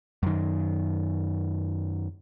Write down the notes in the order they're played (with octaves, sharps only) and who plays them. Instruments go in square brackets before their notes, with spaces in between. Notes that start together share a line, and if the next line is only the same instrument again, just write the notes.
[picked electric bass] F#2 D#3